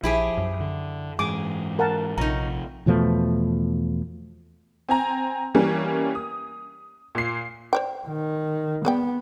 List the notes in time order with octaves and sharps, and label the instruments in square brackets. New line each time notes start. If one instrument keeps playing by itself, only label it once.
[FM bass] A#1 [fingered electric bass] F3 [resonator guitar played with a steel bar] E4 G4 G#4
[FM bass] F#2
[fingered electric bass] D3
[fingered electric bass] G#2 E3 [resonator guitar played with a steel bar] G#4 [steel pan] D6
[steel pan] A#4 F#5 A5
[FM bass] A#1 [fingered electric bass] C3 F3 [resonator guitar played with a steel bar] C#4 D#4 [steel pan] A#5
[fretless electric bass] E2 B2 F3 A3
[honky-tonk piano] C4 G#5 A#5
E3 G3 A#3 C#4
D#6
A#2 C7
[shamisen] C5 D5 G5
[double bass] D#3
[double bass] B3 [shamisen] G#4 D5 G5